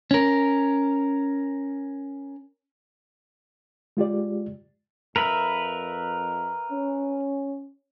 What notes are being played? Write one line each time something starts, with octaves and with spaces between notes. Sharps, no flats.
C#4 A#4
G#3 F4 G4 D5
F2 A#4 B4 E5
C#4